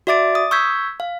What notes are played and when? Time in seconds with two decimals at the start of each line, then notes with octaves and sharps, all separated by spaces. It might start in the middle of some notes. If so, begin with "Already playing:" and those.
0.07 F#4 D5 E5 D6 A6 D7
0.35 D#6
0.51 C#6 E6 G6 G#6 B6
1.00 F5